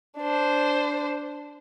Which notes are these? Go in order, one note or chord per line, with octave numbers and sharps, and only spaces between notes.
D4 C5